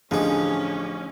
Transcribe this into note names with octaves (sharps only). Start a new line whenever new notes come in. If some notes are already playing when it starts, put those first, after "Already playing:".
A1 D3 F3 C#4 D#4 G#4 G#5